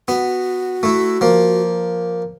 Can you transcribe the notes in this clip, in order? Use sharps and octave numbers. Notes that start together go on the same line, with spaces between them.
B3 F#4
A3 E4
F3 A#3